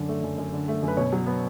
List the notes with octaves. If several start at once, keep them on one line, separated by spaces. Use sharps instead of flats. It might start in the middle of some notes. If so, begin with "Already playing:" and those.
Already playing: F#2 D3 D5
A3
F#2
F#2
D3
A3
F#2 B4
B2 C#5
F#3
B3